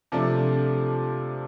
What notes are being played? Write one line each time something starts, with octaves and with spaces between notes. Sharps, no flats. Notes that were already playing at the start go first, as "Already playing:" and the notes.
C3 F3 A3 D4